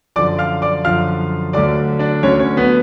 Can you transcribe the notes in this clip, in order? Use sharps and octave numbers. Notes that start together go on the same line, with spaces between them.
F#2 D3 F3 D5 D6
F5 F6
D5 D6
F#2 D3 F3 F5 F6
D2 D3 F#3 D5 D6
D4 D5
D2 D3 F#3 C#4 C#5
C#4 C#5
B3 B4